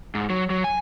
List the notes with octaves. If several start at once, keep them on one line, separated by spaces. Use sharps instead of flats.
G#2
F#3
F#3
G#5